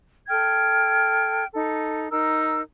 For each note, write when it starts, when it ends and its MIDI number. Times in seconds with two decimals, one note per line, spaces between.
0.28 1.45 69
0.28 1.45 79
0.28 1.45 89
0.28 1.45 92
1.53 2.10 63
1.53 2.10 69
2.10 2.61 63
2.10 2.61 70
2.10 2.61 88